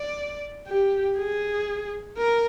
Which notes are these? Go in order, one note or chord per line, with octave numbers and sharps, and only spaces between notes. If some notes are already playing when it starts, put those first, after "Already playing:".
Already playing: D5
G4
G#4
A#4